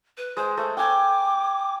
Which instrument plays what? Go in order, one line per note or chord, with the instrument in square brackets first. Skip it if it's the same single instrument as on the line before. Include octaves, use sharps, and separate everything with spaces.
[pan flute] B4
[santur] G#3 [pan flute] C5
[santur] A3 [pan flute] C5
[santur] G5 G#5 [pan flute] D6